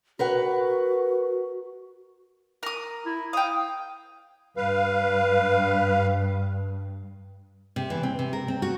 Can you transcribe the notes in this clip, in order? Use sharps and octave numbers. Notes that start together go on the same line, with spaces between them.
F#4 A#4 B4 F#5
A#4 D#6
E4
F5 G5 D#6
G2 B4 F5
C3
E3
C4
C3
A#4
C4
F#4